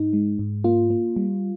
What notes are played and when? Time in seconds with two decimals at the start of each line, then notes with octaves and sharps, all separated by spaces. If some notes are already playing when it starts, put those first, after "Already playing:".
Already playing: G#2 D#4
0.13 G#3
0.39 G#2
0.64 A#3 F4
0.90 A#3
1.16 G3